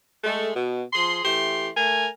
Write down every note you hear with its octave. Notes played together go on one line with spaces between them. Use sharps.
G#3 A3
B2
F3 G#4 C6
E3 A3 G4 C6
A3 A#4 G#5